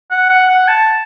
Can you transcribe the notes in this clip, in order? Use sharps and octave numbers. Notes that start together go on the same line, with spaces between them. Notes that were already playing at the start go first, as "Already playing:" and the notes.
F#5
F#5
F#5
A5